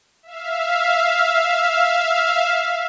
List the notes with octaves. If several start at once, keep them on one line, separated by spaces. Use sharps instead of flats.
E5 F5